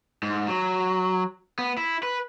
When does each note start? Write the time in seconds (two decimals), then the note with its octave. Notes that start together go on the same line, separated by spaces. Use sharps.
0.23 G#2
0.48 F#3
1.59 B3
1.77 E4
2.03 B4